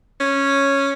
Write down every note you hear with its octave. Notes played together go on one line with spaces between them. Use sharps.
C#4